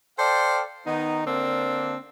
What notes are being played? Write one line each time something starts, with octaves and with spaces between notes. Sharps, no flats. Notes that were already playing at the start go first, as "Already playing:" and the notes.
A4 C5 D5 F5 G5
D#3 B3 D#4
D3 A#3 C4 D4